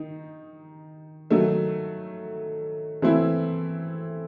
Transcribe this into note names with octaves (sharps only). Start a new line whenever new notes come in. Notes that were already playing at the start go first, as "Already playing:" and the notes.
Already playing: D#3 D#4
D#3 F#3 A3
E3 A3 C4 E4